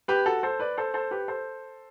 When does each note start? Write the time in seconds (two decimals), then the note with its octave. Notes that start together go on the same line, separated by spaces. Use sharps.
0.08 G4 B4
0.26 F#4 A4
0.43 A4 C5
0.60 B4 D5
0.77 A4 C5
0.94 A4 C5
1.11 G4 B4
1.28 A4 C5